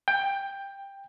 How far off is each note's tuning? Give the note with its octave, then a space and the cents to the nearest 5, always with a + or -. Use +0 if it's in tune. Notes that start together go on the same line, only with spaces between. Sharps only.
G5 +10